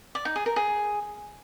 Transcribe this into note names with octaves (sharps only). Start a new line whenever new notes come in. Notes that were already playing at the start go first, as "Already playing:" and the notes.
D5
D#4
G#4
A#4
G#4